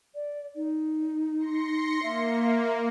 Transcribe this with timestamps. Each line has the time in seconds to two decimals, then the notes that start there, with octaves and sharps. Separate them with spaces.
0.15 D5
0.56 D#4
1.38 C6 A#6 C#7
2.03 A#3 E5